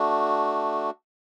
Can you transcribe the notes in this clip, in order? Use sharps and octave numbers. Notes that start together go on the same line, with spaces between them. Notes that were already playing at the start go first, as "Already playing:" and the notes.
Already playing: A3 D4 F#4